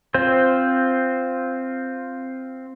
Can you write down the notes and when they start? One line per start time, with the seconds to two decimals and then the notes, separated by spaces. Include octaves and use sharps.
0.14 C4 F4 C5